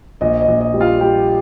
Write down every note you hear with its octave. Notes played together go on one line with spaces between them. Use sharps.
A#1 D#5
D#5
A#1
D#5
G3
F4 F5
G3 G4 G5